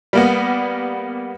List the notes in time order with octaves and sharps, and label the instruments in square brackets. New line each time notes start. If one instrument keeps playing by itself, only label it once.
[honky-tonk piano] G3 A#3 B3